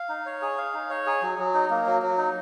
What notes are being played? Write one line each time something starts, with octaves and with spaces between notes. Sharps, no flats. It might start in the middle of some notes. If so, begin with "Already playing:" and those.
Already playing: F5
D#4
C#5
G#4
F5
D#4
C#5
G#4
F#3
F#3
D#4
A#3
F#3
F#3
D#4